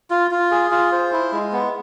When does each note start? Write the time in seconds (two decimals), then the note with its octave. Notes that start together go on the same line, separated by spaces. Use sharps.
0.10 F4
0.31 F4
0.51 G#4
0.71 F4
0.92 C5
1.12 E4
1.32 G#3
1.53 B3